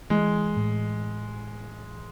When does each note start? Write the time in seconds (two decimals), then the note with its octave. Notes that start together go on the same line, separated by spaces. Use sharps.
0.10 E3 G#3
0.57 A2